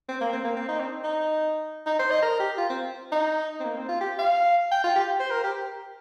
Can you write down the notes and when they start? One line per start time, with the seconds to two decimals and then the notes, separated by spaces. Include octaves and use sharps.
0.09 C4
0.21 A#3
0.33 C4
0.44 A#3
0.56 C4
0.68 D#4
0.80 C4
1.04 D#4
1.86 D#4
1.99 C5
2.10 D#5
2.23 A#4
2.40 G4
2.58 F4
2.70 C4
3.12 D#4
3.60 C4
3.65 A#3
3.77 C4
3.89 F4
4.01 G4
4.19 F5
4.72 G5
4.84 F4
4.96 G4
5.20 C5
5.31 A#4
5.44 G4